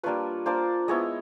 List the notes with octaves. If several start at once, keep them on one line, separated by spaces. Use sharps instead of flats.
G3 A#3 D4 F4 B4 C#5
A#3 D4 F4 C5 D5
G#3 B3 E4 C#5 D#5